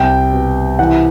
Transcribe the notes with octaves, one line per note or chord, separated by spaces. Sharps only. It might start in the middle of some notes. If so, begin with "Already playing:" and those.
Already playing: C2 G5
B2
E3 F#5